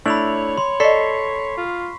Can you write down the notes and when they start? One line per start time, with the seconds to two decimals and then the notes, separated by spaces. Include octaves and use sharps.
0.06 A3 D4 E4 C#5 B5 F7 F#7
0.58 C6
0.80 A4 D5 D#5 C#6 B6 C7
1.57 F4